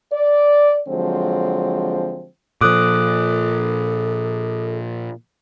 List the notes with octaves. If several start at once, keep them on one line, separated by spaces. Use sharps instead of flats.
D5
D3 F3 F#3 G#3 C4
A#2 F3 A4 D6 D#6 F#6